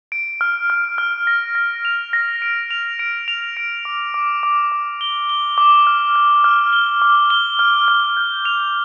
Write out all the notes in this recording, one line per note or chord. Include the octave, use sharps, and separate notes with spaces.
D7
F6
F6
F6
A#6
A#6
F7
A#6
D7
F7
D7
F7
D7
D6
D6
D6
D6
G7
G7
D6
F6
F6
F6
G7
D6
G7
F6
F6
G6
F7